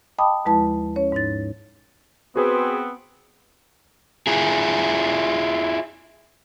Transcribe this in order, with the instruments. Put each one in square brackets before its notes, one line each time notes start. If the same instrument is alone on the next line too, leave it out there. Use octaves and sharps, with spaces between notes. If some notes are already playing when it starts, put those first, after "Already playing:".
[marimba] D#5 G5 A5 B5 D6 D#6
D#2 F3 G#3 E4 B4 A5
C#4 C#5
G#2 D#4 A6
[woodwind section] B3 C4 [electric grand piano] F#4 G#4 B4
[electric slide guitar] E4 F4 G#4